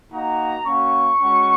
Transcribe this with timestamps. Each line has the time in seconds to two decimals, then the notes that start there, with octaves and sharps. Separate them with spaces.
0.12 A#3 D#4 F#4 A#5
0.66 A#3 C#4 F#4 C#6
1.21 G#3 C#4 F#4